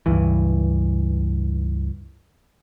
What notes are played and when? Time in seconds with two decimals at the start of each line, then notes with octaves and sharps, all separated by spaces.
0.06 C#2 G2 E3